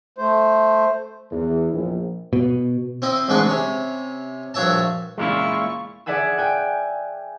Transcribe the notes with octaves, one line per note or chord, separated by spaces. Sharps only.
A3 C5
E2
A#1
B2
C4 E4 D#5
A1 G#2 G#3 D4 B4 C#6
C3 C#4
A#1 G2 F#4 C#5 E5 A5
E2 A#2 C#3 G#3 A#3 E4 F4 C#6
G#4 D5 E5 F#5 G#5 E6
G5 G#5 F#6